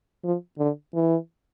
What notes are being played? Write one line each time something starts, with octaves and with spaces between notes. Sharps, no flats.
F3
D3
E3